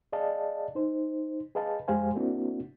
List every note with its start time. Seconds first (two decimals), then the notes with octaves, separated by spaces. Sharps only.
0.13 G#4 D5 D#5 F5 A5
0.75 D#4 C5
1.55 G#4 B4 D#5 F5 A5
1.88 F2 G#3 G4 C5 F5 G#5
2.15 A#3 C4 D4 E4 F#4